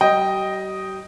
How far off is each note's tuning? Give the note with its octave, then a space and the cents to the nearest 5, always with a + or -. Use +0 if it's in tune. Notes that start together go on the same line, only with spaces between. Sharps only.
G3 -45 D#5 +0 G5 +0